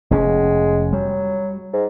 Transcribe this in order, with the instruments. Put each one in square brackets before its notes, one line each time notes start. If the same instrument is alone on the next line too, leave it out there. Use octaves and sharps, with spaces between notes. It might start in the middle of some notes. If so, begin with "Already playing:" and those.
[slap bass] F1 C4 C#4 [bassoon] G#3
[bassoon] F#3 [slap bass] G3
[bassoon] G#2